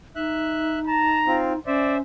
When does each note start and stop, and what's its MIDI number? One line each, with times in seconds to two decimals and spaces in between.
0.16 1.60 63
0.16 0.79 76
0.16 0.79 90
0.87 1.19 81
0.87 1.40 82
1.27 1.53 60
1.27 1.53 65
1.67 2.02 61
1.67 1.98 72
1.67 1.95 74
1.67 1.98 76